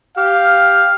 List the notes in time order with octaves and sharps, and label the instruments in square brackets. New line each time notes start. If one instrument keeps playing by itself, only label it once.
[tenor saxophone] G4 [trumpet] F5 [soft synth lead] F6